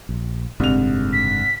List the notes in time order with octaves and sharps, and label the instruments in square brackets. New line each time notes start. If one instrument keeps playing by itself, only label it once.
[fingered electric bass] A#1
[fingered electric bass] F#1 G#2 D3 [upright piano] C2 F7
[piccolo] B6